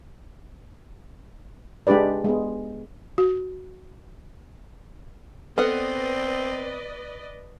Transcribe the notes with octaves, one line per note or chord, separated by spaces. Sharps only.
G#3 D4 G4 B4 D5
G#3 B3
F#4
B3 C4 A4 B4 D5 D#5 F#5